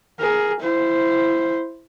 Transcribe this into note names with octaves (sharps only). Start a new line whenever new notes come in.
G#4 A#4
E4 C5